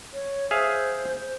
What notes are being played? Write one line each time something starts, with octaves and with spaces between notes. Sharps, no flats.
C#5
G#4 C5 E5 F5